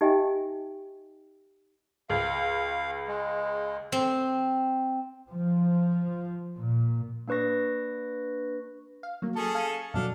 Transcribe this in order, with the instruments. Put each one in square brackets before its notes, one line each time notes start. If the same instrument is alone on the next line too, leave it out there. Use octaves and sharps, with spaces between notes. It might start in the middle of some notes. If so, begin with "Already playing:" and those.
[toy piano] D#4 G4 D#5 E5 G5 G#5
[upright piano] C#2 [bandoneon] F5
[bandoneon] G#3
[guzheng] C4
[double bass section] F3
A#2
[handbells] A#3 D4 B4 C#6 A#6
[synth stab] F5
F#3 A#3
[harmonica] C#4 G#4 A4
[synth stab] F5 G#5
[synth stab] F#2 B2 F#3 [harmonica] D4 A4 F5